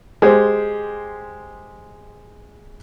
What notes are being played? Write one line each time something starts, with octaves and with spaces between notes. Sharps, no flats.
G#3 G4 C5